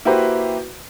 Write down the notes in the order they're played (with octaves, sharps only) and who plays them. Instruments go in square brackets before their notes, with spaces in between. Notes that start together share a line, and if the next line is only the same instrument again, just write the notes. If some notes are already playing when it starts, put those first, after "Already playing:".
[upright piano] A#3 E4 F#4 G4 B4 C5